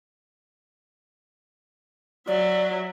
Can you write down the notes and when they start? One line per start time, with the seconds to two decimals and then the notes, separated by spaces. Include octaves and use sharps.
2.27 F#3 D5 E5